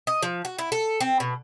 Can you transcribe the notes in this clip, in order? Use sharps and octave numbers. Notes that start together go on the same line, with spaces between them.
D#5
F3
F#4
E4
A4
C4
B2